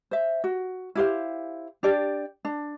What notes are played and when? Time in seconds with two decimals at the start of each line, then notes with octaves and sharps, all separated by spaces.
0.11 C5 E5
0.44 F#4
0.95 E4 G4 C5 F5
1.83 D4 G4 D5
2.45 D4